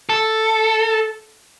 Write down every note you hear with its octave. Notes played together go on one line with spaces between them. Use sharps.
A4